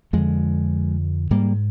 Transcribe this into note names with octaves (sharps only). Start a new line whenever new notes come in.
F2 D3 F3 G#3
G#2 G3 A#3